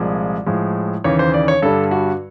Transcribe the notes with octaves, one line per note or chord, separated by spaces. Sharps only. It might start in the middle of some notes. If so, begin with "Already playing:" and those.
Already playing: C2 A#2 F3 G#3
A2 F3 G#3
D#2 C#3 E3 C#5
C5
D5
C#5
G2 D3 G3 A4
F#4